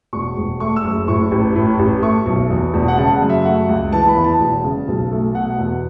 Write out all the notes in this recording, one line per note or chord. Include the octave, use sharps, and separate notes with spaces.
E1 C#6
E1
A3 C#6
E6
F#1
A2 C#6
A1
A2
A1
A3 C#6
B1
E2
E1
F#5
C#3 A5
F#5
F#2
E5
A3 F#5
C#2
E3 A5
B5
E2
A5
E1
C#3
B1
A3
B2 F#5
F#5
E2